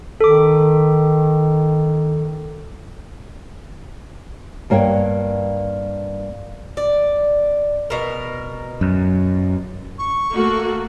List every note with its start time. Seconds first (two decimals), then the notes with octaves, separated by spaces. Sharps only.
0.21 D#3 A4 D6
4.70 G2 A#3 C#5 F#5 G5
6.77 D5
7.90 B2 A#4
8.81 F#2
9.99 C#6
10.32 A3 A#3 F#4